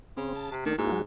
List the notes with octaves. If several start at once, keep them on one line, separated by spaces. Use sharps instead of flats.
C#3 C4
A5
C3
D#3 A3 D4
G#2 A#3 E4 F#4
F#3 G#3 F#4